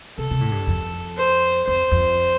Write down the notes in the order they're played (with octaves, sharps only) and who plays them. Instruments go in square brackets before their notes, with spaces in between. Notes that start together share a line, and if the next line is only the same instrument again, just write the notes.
[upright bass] C3 [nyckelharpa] A4
[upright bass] C3
A2
G2
F2
[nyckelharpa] C5
[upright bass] F2 [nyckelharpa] C5
[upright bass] F2